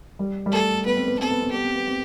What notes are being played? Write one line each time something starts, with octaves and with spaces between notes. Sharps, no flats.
G3
G3
A3 A4
B3 B4
C4
B3
C4 A4
B3
C4
B3 G4
C4
B3
C4